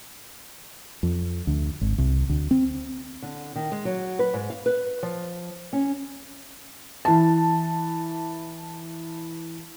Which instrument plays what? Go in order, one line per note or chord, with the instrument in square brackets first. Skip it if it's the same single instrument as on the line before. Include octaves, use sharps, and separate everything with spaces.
[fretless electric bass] F2
D2
G#1
C2
D2
C4
[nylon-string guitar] D3
D#3
G#3
F#3
B4
G#2
F5
B4
F3
C#4
[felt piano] E3 A5